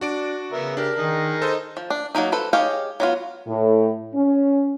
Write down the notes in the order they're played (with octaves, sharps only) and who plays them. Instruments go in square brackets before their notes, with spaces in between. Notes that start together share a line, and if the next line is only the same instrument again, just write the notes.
[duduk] D4 [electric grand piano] F#4 D5 D7
[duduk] C#3 [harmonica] B3 A#4 E5
[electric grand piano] D4 [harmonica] G4 [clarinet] A#4
[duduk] D#3 [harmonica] D#4 G#4
[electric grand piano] A4 D#5 [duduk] C5
[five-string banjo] F3
D4
F#3 A3 A#3 D#4
A4 B4 C5
D#4 G4 G#4 C#5 F5
F#3 B3 F4
[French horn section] A2
C#4